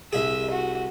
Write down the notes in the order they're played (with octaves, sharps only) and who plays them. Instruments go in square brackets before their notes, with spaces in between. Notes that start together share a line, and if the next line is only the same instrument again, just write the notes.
[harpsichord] C2 G#4 [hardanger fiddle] E5
[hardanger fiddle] F#4